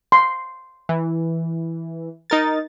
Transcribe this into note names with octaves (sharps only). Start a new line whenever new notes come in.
C6
E3
D#4 A#4 A6